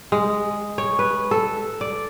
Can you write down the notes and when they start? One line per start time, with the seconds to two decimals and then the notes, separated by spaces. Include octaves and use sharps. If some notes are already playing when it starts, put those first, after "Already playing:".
0.12 G#3
0.78 C#5
0.99 B4
1.31 A4
1.81 D5